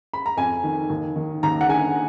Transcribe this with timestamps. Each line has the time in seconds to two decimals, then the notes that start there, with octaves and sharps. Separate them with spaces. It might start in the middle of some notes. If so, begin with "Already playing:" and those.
0.13 B5
0.26 A#5
0.37 F2 G#5
0.64 D#3
0.90 D#2
1.16 D#3
1.43 D#2 A#5
1.61 F#5
1.69 D3 G#5